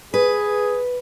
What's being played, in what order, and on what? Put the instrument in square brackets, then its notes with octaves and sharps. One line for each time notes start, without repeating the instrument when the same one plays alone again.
[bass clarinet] G#4 [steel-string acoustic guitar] B4